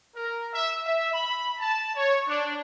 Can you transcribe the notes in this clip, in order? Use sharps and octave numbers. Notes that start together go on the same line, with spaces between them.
A#4
E5
E5
B5
A5
C#5
D4